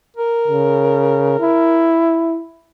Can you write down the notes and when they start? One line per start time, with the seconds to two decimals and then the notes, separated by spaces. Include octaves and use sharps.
0.17 A#4
0.48 C#3
1.40 E4